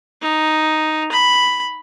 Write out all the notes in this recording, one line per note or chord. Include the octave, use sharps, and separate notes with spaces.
D#4
B5